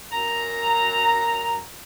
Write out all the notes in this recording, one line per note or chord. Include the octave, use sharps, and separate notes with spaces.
F#2 A#5